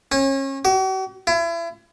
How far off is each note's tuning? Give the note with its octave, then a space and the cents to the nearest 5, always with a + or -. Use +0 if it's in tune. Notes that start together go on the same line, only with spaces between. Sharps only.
C#4 -30
F#4 +45
E4 +35